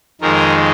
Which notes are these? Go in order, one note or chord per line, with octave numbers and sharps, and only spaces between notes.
F2 D#3 G#3 A#4